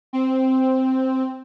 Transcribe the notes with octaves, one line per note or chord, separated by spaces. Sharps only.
C4